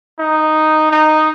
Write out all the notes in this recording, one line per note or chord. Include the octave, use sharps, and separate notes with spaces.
D#4
D#4